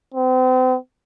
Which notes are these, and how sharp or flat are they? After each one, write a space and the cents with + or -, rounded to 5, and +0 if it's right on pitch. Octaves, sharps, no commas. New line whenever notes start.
C4 -35